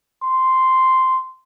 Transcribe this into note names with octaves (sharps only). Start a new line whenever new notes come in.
C6